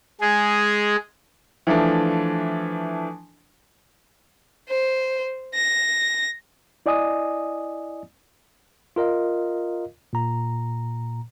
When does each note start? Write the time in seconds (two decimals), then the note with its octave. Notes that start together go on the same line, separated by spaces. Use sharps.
0.21 G#3 G#4
1.67 E3 F3 A3 D4
4.69 C5
5.54 A#6
6.86 E4 D5 D#5 G#5 D#6
8.96 F4 A#4 D#5 F5
10.13 A#2 A#5